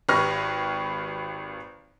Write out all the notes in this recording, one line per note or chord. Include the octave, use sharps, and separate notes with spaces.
G#1 G4 B4 C#6 F6 A#6